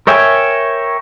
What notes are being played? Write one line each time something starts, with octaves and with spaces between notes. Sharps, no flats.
A#4 C#5 E5 G5 G#5